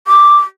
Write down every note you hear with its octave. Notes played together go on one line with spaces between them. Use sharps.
D6